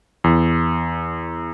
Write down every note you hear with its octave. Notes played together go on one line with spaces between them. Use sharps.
E2